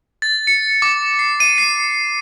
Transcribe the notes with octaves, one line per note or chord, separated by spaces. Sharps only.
A6
C#7
D6
C7
D#7
C7